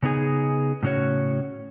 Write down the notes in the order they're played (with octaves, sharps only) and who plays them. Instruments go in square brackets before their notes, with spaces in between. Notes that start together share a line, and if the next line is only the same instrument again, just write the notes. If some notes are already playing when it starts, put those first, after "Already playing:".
[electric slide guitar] C#3 B3 D#4 G#4 G#5
A2 C#3 C#4 F#4 C#5